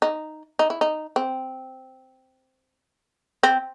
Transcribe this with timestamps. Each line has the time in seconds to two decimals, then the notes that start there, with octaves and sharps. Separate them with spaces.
0.02 D#4
0.59 D#4
0.70 E4
0.81 D#4
1.16 C4
3.43 C4